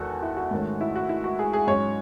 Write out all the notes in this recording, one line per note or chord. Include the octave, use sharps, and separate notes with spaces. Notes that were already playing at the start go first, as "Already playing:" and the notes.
Already playing: E2 D#3 G#3 F#4 A4
E4
F#4
G#2 D#3 A3 C#4
E4
F#4
E4
F#4
G#4
G#4
G#2 F#3 C#4 C#5